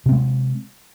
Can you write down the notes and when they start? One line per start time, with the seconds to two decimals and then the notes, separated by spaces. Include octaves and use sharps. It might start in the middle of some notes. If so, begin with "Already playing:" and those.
0.06 C3
0.09 C4
0.12 G#3